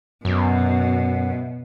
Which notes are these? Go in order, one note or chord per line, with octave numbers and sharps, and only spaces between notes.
F#2 B2